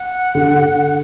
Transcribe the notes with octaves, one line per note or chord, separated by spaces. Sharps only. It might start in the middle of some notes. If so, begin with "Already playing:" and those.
Already playing: F#5
D3